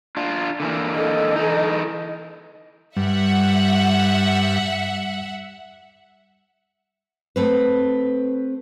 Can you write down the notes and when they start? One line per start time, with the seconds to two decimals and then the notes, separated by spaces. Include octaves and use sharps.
0.17 D4 F4
0.60 D3 E3 A#3
0.96 A4 D#5
1.36 E3 D#4
2.97 G2 G3 E5 F#5
7.36 A3 C4 B4